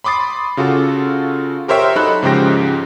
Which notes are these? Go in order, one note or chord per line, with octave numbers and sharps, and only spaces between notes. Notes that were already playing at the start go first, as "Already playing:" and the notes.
B5 C6 D6 D#6 A6 C7
C#3 F4 F#4 A4
G4 A#4 C5 C#5 E5 G5
F#3 D#4 A4 B5 F#6
G#2 C#3 F3 G4 G5 A#6